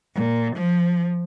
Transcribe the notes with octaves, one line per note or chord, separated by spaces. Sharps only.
A#2
F3